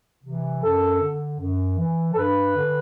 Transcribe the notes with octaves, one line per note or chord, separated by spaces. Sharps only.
C3 E3
F#2 A4
D3
F#2
E3
A4
G2 B4
D3